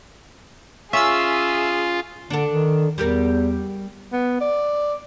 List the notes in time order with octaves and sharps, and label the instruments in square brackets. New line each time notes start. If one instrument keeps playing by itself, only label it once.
[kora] C#4 [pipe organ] F4 [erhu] G#4 [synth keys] E5 E6
[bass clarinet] D3 [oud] D4 A4
[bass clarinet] D#3
[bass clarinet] E2 [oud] G3 G4 A#4
[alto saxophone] B3
D5